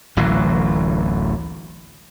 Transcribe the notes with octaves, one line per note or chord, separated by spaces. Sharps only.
D1 A1 E3 F#3